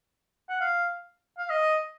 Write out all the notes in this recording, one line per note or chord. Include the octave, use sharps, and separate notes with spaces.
F#5
F5
F5
D#5